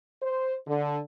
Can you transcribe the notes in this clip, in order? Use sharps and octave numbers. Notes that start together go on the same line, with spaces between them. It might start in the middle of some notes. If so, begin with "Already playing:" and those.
C5
D3